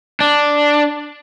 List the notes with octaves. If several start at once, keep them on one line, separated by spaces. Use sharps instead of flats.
D4